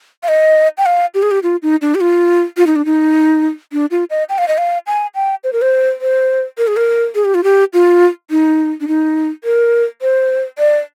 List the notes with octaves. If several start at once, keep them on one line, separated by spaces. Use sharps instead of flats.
F5
D#5
G5
F5
G4
G#4
G4
F4
D#4
D4
G4
F4
F4
D#4
D4
D#4
D4
F4
D#5
G5
F5
D#5
F5
G#5
G5
C5
A#4
C5
C5
A#4
G#4
A#4
G#4
G4
F4
G4
F4
D#4
D4
D#4
A#4
C5
D5